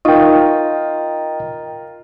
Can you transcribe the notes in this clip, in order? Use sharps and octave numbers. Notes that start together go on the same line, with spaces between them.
D#4 F4 A#4 D#5 G5